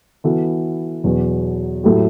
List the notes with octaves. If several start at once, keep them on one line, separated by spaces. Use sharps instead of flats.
E3 B3 F#4 A4
E2 B2 F#3
A2 F#3 A3 E4 G4